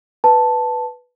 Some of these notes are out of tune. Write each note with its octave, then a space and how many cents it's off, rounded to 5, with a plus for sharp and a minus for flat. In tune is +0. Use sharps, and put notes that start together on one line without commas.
B4 +0 A5 +0